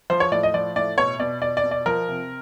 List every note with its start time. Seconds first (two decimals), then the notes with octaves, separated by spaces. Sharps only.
0.10 F3 C5
0.20 C#5
0.32 A2 D5
0.43 D#5
0.54 F3 D5
0.76 A2 D5
0.98 B2 C#5
1.20 B2 D5
1.42 B2 D5
1.57 D5
1.64 B2
1.71 D5
1.86 F3 A#4
2.08 C3